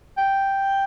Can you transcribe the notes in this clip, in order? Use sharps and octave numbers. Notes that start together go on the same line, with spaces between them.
G5